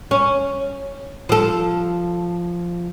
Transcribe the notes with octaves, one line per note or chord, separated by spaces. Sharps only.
C#4
F3 A4